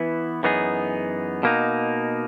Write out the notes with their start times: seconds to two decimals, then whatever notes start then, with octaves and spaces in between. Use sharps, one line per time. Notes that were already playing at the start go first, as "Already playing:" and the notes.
Already playing: E3 B3 E4
0.43 F#2 E3 B3 D#4 G#4
1.43 B2 A#3 D#4